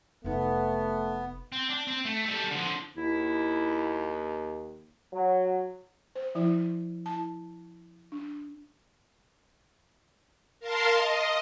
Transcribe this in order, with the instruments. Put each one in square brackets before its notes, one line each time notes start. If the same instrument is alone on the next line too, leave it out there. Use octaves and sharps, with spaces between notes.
[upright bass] F1 D#4 [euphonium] A3 [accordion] B3
[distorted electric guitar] C4
D4
C4
A3
G3 A4
D3 F3
[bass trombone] D#2 [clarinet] E4
[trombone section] F#3
[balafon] C5
F3 E4 D5
E4 A5
D4
[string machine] A#4 F5 A5 C6
D#5